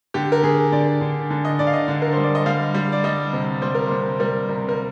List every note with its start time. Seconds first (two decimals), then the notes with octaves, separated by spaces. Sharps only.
0.14 D3 G4
0.32 A#4
0.43 D3 G#4
0.72 D3 D5
1.01 D3
1.30 D3
1.45 D#5
1.59 D3 D5
1.67 F5
1.73 D#5
1.88 D3
2.02 A#4
2.13 G3 C5
2.24 D5
2.35 D#5
2.46 G3 F5
2.74 G3
2.92 D5
3.04 G3 D#5
3.33 C3
3.62 G3 C5
3.75 A#4
3.87 C3 C5
4.20 G3 A#4
4.49 C3
4.69 A#4